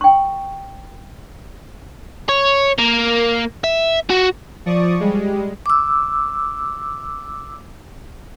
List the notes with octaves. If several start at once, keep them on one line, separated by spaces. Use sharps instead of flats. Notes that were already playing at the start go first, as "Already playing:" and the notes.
G5 C#6
C#5
A#3
E5
F#4
F3 D5 C#6 D#6
G3 G#3
D6 E6